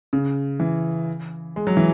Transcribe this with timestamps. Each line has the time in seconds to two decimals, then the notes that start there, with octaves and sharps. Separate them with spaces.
0.13 C#3
0.60 E3
1.56 G#3
1.67 F#3
1.77 E3